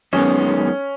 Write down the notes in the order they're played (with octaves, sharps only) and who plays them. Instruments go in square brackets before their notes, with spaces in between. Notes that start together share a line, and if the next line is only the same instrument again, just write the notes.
[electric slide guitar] F#2 D#3 G#3 B3 D#4 [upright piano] C#4